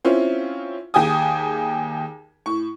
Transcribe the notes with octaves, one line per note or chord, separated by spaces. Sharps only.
C4 C#4 E4 F4
D#2 G4 G#4 G#5 D#6
A2 C#6